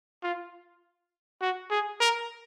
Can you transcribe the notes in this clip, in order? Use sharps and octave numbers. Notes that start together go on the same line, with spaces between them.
F4
F#4
G#4
A#4